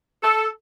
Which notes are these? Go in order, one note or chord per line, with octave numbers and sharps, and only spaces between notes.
A4